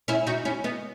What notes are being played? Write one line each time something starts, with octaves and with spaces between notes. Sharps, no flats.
C#4 E4
D#4 F#4
C#4 E4
B3 D#4